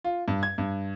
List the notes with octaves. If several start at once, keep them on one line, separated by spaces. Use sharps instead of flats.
F4
G2
G#6
G2